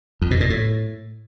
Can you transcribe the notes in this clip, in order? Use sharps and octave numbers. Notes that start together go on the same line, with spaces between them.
F2
B2
A#2
A2